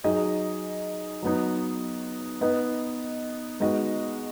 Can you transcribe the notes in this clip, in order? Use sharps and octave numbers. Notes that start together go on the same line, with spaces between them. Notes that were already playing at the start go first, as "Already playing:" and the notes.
F#3 D#4 G#4 D#5
F#3 B3 D#4
B3 D#4 B4 D#5
G#3 B3 D#4 F#4 D#5